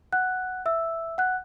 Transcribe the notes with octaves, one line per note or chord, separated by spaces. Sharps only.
F#5 F#6
E5 E6
F#5 F#6